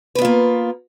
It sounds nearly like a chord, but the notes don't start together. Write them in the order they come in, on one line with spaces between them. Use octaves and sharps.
B4 B3 F4 A#3